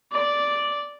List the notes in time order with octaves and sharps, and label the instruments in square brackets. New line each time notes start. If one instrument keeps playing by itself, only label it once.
[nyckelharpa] D5